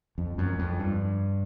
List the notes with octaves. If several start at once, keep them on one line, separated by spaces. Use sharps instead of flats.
F2
F#2
F2
G2